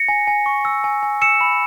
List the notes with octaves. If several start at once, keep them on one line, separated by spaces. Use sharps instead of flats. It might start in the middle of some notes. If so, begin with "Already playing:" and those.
Already playing: A#6 C#7
G#5
G#5
C#6
E6
G#5
G#5
E6 C#7 E7
B5